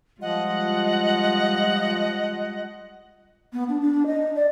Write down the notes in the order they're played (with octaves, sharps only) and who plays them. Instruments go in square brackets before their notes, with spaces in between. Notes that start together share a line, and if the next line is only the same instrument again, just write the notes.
[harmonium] F3 [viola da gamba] G3 G#3 F4 [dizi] D#5 [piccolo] F#5
[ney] B3
D4
D4
D#5
D5